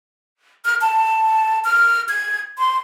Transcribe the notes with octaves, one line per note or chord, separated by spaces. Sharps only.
F6
A5
F6
G#6
C6